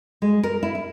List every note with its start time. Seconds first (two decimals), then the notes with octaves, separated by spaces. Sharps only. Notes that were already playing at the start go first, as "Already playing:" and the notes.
0.22 G#3
0.43 A#4
0.63 E4
0.75 E4